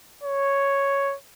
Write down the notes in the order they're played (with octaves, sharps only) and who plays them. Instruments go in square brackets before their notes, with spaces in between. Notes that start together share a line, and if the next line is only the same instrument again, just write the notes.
[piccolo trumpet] C#5